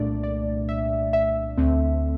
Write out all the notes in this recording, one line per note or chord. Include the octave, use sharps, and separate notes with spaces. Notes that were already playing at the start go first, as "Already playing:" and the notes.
Already playing: C2 A#2 A3 D4 D5
D5
E5
E5
D2 D3 A3 C4